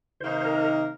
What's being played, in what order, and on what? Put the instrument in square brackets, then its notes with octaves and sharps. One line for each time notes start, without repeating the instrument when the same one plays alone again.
[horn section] C3 D#3 A#3 D#4 [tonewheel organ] C5
[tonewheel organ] A#4